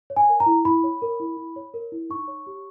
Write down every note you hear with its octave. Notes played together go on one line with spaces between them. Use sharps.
C#5
G#5
A#4
A#5
E4
E4 B5
C#5
A#4
E4
E4
C#5
A#4
E4
D#4 C#6
C#5
G4